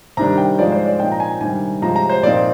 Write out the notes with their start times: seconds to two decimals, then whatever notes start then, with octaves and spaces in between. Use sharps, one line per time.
0.17 C3 D#3 G3 D4 A#5
0.38 G5
0.59 G#2 F3 G#3 D5
0.72 C5
0.86 D5
1.00 A#2 F3 C4 D#4 G5
1.12 A#5
1.20 G#5
1.41 C3 D#3 G3 D4 G#5
1.82 C3 F3 G#3 A#5
1.96 A#5
2.09 C5
2.23 A#2 F3 C4 D#4 D5